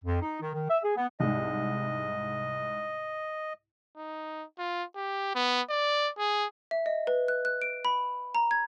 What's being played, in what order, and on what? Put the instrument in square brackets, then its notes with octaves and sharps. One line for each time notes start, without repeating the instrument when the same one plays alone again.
[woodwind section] F2
D#4
D#3
D#3
E5
G#4
B3
[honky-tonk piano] C2 G#2 [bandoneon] D#5
[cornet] D#4
F4
G4
B3
D5
G#4
[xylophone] E5
D#5
B4
F#6
F#6
D7
B5
A#5
G#6